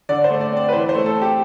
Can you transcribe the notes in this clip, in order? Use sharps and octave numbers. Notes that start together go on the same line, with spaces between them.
D3 D5
C5
A3
D5
C4 D5
B4
E3 C5
C5
A3
A4
C4
G4